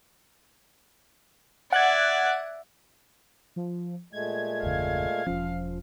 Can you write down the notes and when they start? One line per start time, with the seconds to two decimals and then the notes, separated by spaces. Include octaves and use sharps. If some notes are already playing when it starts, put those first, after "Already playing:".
1.72 D5 E5 F#5 F#6 G#6
3.56 F3
4.13 A#2 G#3 A3 G#6
4.63 G1 E2 C#3 F5
5.27 E1 F3 C#4